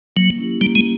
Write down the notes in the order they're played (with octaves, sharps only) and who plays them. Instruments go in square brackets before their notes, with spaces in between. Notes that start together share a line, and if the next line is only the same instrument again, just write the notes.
[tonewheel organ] F#3 [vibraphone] A#3
[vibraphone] C#4 E4 G4
[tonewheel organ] G3 [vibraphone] A#3
[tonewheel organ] G#3